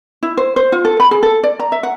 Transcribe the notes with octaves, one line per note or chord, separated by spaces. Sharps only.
E4
C5
C5
F4
A4
B5
G#4
A4
D5
A#5
E5
F#5